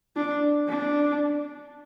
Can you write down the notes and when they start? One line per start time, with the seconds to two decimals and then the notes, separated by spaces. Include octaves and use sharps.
0.16 D4
0.68 D4